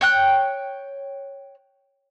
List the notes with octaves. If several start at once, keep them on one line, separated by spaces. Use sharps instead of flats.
C#5 G5 F#6